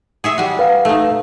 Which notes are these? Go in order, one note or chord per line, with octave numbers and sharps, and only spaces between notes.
G#4 C#5 E5
G3 F#4
B4 F5
A3 D#4